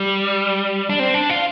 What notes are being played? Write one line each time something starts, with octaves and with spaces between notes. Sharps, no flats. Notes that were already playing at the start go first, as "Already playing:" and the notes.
Already playing: G3
D4
C4
D4
F4